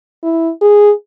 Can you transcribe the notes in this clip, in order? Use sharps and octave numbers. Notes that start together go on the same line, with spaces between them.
E4
G#4